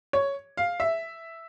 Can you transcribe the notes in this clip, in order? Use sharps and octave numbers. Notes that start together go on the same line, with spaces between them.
C#5
F5
E5